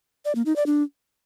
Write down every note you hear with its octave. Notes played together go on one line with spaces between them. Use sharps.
D5
A#3
D#4
D5
D4